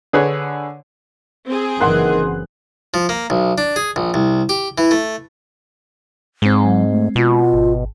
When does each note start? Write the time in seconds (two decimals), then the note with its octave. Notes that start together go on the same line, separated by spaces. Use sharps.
0.13 D3 G#4 B4 C#5
1.47 C4 G#4
1.81 F#1 F#2 D#3 E3 F#5 C6 F#6
2.94 F3
3.09 A#3
3.30 B1
3.58 D4
3.76 G#4
3.96 A#1
4.14 C2
4.49 G4
4.78 E3
4.91 A3
6.42 G#2 G#3 C4
6.61 F#3
6.90 A3
7.16 B2 F4
7.53 G#1